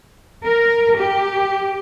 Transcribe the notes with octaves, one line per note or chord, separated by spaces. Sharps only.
A#4
G4